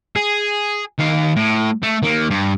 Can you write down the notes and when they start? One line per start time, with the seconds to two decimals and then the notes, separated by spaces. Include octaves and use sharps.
0.16 G#4
0.99 D#3 F5
1.36 A2
1.83 A3
2.03 D#3 A#3
2.30 G2